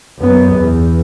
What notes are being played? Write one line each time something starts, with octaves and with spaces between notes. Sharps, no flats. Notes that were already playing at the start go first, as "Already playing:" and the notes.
F#2 B3
E2